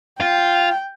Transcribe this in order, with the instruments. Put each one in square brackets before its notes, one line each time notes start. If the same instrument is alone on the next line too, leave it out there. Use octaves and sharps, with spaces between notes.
[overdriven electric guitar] F4 [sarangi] G5